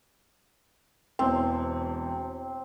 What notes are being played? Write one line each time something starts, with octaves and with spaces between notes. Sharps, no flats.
E1 E2 C4